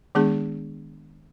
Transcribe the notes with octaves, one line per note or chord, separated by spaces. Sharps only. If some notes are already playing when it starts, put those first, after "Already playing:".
D#3 G#3 B3 D4 G#4